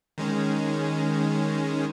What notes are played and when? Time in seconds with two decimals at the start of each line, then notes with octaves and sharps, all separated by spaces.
0.18 D#3 G#3 C#4